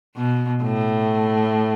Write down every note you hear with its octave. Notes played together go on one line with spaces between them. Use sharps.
B2
A2